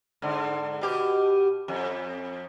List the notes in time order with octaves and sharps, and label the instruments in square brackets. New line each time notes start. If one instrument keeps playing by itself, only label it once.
[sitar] G#2 D3
B2 G4
F2